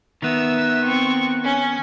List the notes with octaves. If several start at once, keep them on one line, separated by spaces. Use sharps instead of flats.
D#3 B3 E5 E6
C4 C#6
C#4